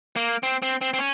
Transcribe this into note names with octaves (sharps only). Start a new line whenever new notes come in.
A#3
C4
C4
C4
C4
C#4